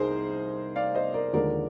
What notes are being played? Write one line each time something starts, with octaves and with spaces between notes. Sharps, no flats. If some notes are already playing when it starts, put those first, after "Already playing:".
Already playing: C2 D#4 G#4 A#4 C5
D5 F5
C5 D#5
A#4 D5
D#2 D3 F3 G#3 A#4 D5